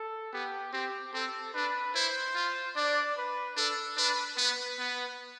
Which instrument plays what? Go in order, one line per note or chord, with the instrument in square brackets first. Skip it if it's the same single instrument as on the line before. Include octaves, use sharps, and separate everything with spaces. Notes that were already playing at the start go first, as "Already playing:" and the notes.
Already playing: [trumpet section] A4
[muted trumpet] B3 [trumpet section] G4
[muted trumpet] C4 [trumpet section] G4
[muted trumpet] C4 [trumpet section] A4
[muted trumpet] D4 [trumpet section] B4
[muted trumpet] E4 [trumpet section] C5
[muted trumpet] F4
[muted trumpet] D4 [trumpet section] D5
[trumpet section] B4
[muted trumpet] D4 [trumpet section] A4
[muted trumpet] D4 [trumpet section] B4
[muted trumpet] B3 [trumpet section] B4
[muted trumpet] B3